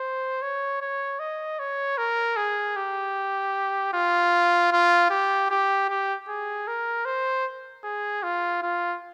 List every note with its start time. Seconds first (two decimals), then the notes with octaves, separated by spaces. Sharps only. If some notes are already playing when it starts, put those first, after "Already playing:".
Already playing: C5
0.42 C#5
0.81 C#5
1.20 D#5
1.59 C#5
1.98 A#4
2.37 G#4
2.76 G4
3.94 F4
4.72 F4
5.10 G4
5.50 G4
5.89 G4
6.28 G#4
6.68 A#4
7.05 C5
7.84 G#4
8.23 F4
8.63 F4